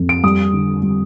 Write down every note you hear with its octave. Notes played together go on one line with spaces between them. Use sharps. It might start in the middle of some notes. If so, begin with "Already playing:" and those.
Already playing: F2
D7
G3 D#6
D3
G3